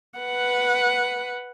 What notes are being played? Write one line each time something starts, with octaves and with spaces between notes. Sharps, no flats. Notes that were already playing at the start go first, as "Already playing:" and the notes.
B4 F#5